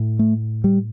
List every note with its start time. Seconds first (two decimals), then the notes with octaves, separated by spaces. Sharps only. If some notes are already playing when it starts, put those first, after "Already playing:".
Already playing: A2
0.19 A3
0.64 G3